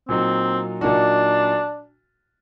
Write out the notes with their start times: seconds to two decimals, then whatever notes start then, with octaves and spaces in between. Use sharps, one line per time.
0.09 A#2 F#3 A#3 C4 D#4 F#4
0.81 A#2 F#3 A#3 D4 D#4 F#4